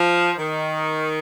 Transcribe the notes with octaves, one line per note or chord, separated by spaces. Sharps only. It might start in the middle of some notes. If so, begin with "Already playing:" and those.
Already playing: F3
D#3